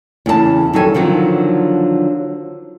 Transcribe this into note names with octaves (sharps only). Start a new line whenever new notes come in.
E2 C#3 G#4 A5
D#3 F#3 G3 A4 D5 G#5
D3 D#3 F3 F#3